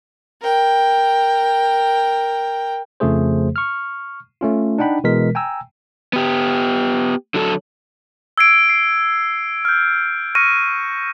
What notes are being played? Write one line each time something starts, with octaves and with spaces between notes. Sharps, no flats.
A#4 G5
F2 C#3 F3 A3 G#4 C5
C#6 F6
A3 C#4 F4
D4 D#4 F#5 G5 B5
B2 E3 G#3 A#4 B6
G5 G#5 A#5 E6
B3 G4
D3 F#3 A4
E6 G#6 C7 D7
C7
F6 G6
C#6 F6 A#6 C#7 D#7